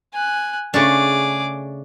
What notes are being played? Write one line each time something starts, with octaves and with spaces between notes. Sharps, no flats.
G#5 F#6
C#3 A3 D4 G#4 D6